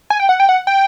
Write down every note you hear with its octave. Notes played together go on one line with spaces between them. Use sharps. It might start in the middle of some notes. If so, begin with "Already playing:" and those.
G#5
G5
F#5
G5
F#5
G5